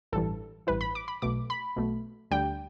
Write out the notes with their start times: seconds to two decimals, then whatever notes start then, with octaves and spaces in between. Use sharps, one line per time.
0.12 A1 G2 E3 A4
0.67 A1 G2 E3 B4
0.81 B5
0.95 D6
1.08 B5
1.22 B1 B2 A3 D6
1.50 B5
1.76 B1 B2 A3
2.31 D2 D3 G3 G5